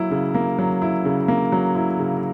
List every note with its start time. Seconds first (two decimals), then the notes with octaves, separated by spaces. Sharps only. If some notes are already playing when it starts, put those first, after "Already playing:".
Already playing: F#3 A#3 E4
0.11 C#3
0.34 A#3
0.58 F#3
0.82 E4
1.05 C#3
1.28 A#3
1.52 F#3
1.75 E4
1.99 C#3